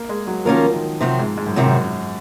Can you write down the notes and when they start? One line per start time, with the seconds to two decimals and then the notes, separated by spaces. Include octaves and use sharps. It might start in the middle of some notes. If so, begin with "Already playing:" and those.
Already playing: A#3
0.09 G#3
0.27 F#3
0.45 D#3 F3 A#3 C#4 F4 A#4
0.74 D#3
1.01 C3 D#3 F3 F#3 C4
1.19 G#2
1.37 G#2
1.47 F#2
1.56 C3 D#3 F#3 C4
1.65 F#2